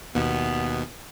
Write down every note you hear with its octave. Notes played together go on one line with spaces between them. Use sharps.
D#2 B2 B3